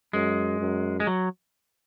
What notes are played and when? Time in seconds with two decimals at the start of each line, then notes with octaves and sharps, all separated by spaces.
0.13 F#2 G#3
0.60 F#2
1.00 G#3
1.07 F#3